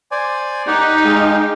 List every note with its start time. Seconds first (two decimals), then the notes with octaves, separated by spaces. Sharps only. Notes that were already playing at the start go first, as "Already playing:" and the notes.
0.11 C5 D5 G#5
0.67 D#4 G4 F#5
1.05 G#3 D#5 F5 G5